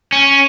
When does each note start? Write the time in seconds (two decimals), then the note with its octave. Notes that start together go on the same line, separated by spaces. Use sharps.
0.13 C#4